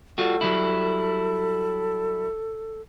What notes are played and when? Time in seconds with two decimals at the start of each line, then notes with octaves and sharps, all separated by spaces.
0.18 G3 F4 F#4 A4
0.41 F#3 G3 E4